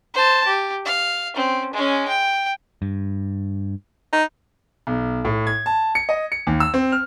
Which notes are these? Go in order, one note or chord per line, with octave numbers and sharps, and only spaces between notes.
C5 A5
G4
F5
C4 C#4
G#3 C#4
G5
G2
D#4
B1
A2
G#6
A5
C#7
D#5
C#7
D#2
E6
C4
F6